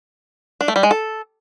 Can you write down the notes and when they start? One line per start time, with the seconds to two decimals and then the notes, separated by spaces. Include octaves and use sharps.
0.61 D4
0.68 A3
0.76 G3
0.83 G#3
0.91 A4